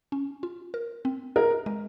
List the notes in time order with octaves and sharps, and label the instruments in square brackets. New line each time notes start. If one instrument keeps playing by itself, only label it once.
[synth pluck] C#4
F4
A#4
C4
[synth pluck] G#4 [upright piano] A#4
[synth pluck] G#3